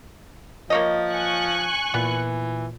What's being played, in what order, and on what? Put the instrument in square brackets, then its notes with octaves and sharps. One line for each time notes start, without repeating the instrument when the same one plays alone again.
[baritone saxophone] F3 [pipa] A#3 C#5 D#5
[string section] G#5 C#6 F#6
[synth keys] A#2 [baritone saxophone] E3 [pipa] B3